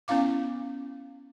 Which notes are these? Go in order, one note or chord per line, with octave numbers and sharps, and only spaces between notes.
B3 C#4 E4 F5 D6